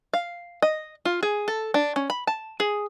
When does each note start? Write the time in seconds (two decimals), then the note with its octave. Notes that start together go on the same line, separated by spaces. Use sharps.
0.14 F5
0.62 D#5
1.05 F4
1.23 G#4
1.48 A4
1.74 D4
1.96 C#4
2.10 B5
2.27 A5
2.60 G#4